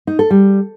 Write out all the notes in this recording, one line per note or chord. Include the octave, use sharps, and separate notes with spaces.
D#4
A4
G3